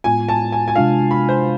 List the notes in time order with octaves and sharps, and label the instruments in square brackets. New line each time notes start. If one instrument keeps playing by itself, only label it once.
[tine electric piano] A2 G#3 B3 F4 [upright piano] G#5
[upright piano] A5
G#5
G#5
[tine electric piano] C3 G#3 D4 F4 [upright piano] F5
[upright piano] B5
C5